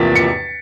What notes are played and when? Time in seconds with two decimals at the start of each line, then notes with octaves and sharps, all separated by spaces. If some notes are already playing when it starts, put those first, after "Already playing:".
Already playing: E2 C3 F3 A#3 A6 B6
0.15 C#7